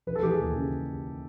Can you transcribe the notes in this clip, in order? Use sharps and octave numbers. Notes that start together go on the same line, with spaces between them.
E3 B4
A4
E3 G4
G#4
D#2
C#3